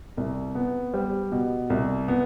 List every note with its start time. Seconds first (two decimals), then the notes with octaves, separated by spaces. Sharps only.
0.17 C2
0.55 B3
0.94 G3
1.32 B2
1.70 C2
2.08 B3